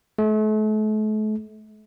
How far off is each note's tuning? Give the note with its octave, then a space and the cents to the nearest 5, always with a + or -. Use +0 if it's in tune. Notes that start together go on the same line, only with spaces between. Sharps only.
A3 -40